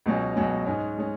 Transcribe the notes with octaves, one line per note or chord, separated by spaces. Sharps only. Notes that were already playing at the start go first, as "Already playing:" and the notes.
C#2 B2 F#3 C#4
C#2 B2 F#3 C#4
G#2 G#3 C#4
G#3 C#4